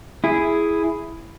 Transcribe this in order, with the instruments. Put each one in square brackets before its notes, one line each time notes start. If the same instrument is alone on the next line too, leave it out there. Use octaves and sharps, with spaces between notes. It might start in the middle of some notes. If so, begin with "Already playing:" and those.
[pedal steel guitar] E4 G#4